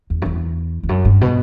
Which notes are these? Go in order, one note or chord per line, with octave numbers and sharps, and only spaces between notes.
E2
F#2
E2
E2
F#2
G2
B2